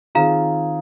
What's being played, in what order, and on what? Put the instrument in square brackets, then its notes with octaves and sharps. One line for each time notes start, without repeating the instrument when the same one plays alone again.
[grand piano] D#3 C4 F4 G#4 [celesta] F5 A#5